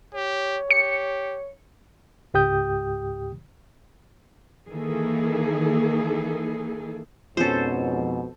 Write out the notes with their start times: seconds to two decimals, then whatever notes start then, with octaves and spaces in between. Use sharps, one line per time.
0.14 G4 C#5
0.71 G4 C#7
2.34 C#2 G#2 G4 G5 D#6 G6
4.70 D#3 E3 A#3 G#4 A4
7.37 F2 G#2 B2 F3 C#4 A4 C5